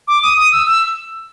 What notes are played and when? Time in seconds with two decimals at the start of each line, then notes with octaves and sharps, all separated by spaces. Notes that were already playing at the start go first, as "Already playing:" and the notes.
0.08 D6
0.23 D#6
0.37 D#6
0.52 E6
0.67 E6